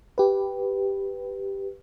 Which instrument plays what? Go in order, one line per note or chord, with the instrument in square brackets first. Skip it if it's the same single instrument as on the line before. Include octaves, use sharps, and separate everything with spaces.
[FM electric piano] G4 B4